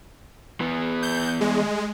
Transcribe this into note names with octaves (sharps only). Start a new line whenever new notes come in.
E3 B3
G6
G#3